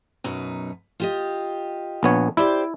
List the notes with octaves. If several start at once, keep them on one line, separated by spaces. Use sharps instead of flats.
F#2 B2 D#4
F4 G4 D#5
A#1 B3 C#5
E4 G4 C5 D5